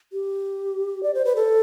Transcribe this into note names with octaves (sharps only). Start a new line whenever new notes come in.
G4
D5
C5
B4
A4